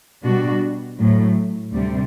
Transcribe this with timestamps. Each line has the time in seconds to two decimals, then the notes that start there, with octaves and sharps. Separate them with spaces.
0.23 B2 G3 D4 F#4
0.97 A2 F#3 A3
1.72 D2 C3 G3